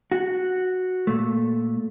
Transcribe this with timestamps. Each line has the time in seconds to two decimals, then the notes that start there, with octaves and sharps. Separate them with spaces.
0.12 F#4
1.07 A#2 A3